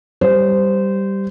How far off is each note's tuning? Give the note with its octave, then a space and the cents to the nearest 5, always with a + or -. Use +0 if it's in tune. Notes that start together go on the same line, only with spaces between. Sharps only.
G3 +0 C5 -20